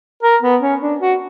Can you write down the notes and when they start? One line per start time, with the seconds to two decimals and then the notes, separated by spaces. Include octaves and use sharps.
0.23 A#4
0.42 B3
0.62 C#4
0.81 D4
1.00 F#4